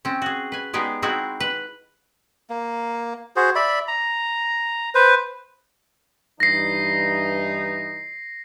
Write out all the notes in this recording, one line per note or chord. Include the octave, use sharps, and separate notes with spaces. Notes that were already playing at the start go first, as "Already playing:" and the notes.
C4 C#4
F#4 G#4
B4 G#5
G#3 B3 D#4 G4 G#4 D5
G#3 C4 D#4 E4 F#4 G#4
B4
A#3
F#4 G#4 C5
D5 E5 B5
A#5
B4 C5
G2 E3 D#4 A#6 C7